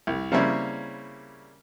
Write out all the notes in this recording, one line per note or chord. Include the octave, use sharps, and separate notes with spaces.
C2
C#3 G3 A#3 C4 E4 C#5